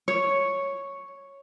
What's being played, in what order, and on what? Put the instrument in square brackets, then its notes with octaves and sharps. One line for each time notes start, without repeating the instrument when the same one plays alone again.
[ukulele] C#5